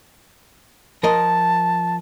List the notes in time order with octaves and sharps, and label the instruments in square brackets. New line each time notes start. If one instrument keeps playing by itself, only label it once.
[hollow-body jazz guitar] F3 A#4 D#5 [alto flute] A5